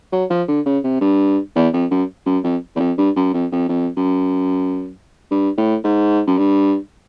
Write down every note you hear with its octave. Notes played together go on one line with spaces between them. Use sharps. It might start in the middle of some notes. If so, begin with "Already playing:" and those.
F#3
F3
D3
C#3
C3
G2
E2
F2
F#2
F#2
F2
E2
F2
G2
F#2
F2
F2
F2
F#2
G2
A2
G#2
F#2
G2